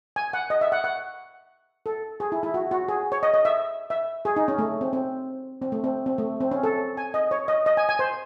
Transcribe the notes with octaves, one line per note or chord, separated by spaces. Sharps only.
G#5
F#5
D#5
E5
F#5
F#5
A4
G#4
E4
E4
F#4
F#4
G#4
C#5
D#5
D#5
E5
E5
G#4
D#4
C#4
A3
C4
C4
C4
A3
C4
C4
A3
C4
C#4
A4
G#5
D#5
C#5
D#5
D#5
G#5
G#5
C5